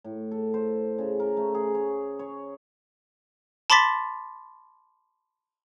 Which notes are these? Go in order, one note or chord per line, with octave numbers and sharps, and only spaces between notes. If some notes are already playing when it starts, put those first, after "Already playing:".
A2
A4
C5
C#3
A#4
A3
G#4
C#5
C#5
A5 B5 C6 D6 A6 B6